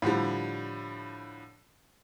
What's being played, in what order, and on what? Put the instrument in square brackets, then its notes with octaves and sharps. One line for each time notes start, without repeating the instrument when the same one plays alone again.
[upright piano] A2 D3 F3 G3